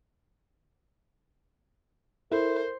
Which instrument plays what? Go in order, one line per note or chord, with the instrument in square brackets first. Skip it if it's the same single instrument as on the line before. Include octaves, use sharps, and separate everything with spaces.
[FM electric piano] E4 [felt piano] A4 [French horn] A#4 [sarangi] C5